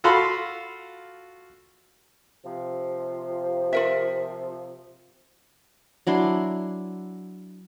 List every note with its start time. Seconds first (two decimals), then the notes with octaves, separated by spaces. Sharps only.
0.04 F4 F#4 A4 F5 B5 C6
2.45 C3 F3
3.73 F4 A#4 E5
6.07 F#3 D4 E4 C6